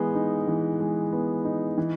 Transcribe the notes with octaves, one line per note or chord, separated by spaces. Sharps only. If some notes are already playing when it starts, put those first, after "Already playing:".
Already playing: E3 G#3 B3
D#4
E3
G#3
B3
D#4
E3